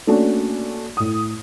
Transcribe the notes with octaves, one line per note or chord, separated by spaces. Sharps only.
A3 A#3 C#4 D4 F#4
A2 D#6